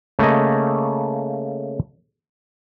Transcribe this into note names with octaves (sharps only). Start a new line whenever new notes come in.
C#3 A3 A#3 D#5